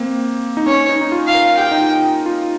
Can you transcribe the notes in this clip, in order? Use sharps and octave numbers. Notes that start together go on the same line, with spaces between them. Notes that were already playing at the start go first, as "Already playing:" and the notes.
Already playing: A#3 C4
D#4
C#4 C#5
D#4
D#4
F4
F5
A#4
G4 G5
D#4
F4
F4